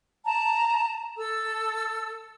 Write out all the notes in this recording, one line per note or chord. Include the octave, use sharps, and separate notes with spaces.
A5 A#5
A4 E6